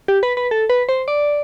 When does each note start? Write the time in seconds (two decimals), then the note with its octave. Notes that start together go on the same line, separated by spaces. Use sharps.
0.08 G4
0.23 B4
0.37 B4
0.51 A4
0.70 B4
0.89 C5
1.08 D5